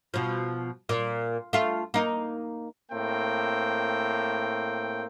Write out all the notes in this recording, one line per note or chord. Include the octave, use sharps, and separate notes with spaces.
B2 F3
A#2
A3 F4
A#3 D#4
A2 A#3 C4 G5